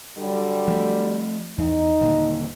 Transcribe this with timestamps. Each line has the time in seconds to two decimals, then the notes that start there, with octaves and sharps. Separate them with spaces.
0.17 D3 F#3 G3
0.68 F3 A3
1.58 E2 D#4
2.01 D#1 A#2 D3